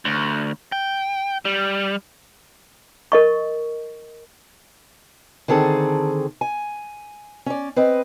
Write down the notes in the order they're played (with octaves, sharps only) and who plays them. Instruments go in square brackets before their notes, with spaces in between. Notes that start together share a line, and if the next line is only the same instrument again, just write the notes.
[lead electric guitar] D2
G5
G3
[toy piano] A#4 D#5 C#6
[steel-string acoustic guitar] D3 D#3 C4 G#4 A4
G#5
C#4 D5
C4 B4 D#5